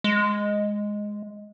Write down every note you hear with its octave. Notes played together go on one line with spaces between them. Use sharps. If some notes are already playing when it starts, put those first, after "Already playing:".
G#3